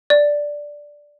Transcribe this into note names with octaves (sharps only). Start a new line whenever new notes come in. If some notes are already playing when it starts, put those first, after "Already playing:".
D5